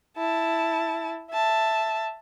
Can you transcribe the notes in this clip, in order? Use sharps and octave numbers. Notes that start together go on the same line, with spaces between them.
E4 A5
E5 A5